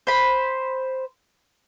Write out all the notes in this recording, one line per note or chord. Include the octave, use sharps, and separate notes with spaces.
C5 B5